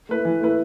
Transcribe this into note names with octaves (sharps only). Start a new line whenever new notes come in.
A3 E4 B4
E3
A3 E4 B4